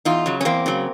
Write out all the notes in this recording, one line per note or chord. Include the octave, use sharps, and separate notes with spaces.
E2 D#4 F4
C#3 F#3
C#4
E2 A#3 C4
C#3 F#3